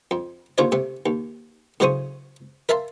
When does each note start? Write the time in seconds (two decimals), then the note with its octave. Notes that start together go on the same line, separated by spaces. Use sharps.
0.11 F2
0.58 D#2 D3 F4 C5 C#5
0.72 C3 A3
1.06 D#2
1.80 A2 C#3 F#3 C5 C#6 D#6
2.69 A#4 E5 F5 A5 C6